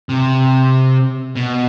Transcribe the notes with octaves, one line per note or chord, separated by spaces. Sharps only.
C3
B2